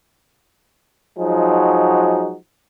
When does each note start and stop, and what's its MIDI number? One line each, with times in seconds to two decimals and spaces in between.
1.19 2.35 53
1.19 2.35 54
1.19 2.35 56
1.19 2.35 63
1.19 2.35 66